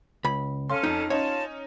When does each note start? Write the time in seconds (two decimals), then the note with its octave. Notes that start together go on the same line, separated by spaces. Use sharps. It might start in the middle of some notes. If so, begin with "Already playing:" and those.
0.24 C#2 B5
0.70 C#4 A4 F5 C6 F6
0.83 F2 D#4
1.10 C#4 D#4 F4 C#5 A5